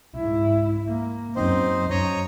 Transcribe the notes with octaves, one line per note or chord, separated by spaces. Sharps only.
G#2 E4
A#3
F#2 C4 D#4 C5
F#2 C#5 D#5 A#5